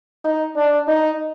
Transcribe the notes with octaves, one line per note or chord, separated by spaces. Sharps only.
D#4
D4
D#4